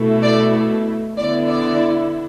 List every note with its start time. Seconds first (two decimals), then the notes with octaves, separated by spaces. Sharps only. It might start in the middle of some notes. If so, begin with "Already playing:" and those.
Already playing: B2 A3 E4
0.22 D5
1.17 D3 B3 E4 D5
1.49 D5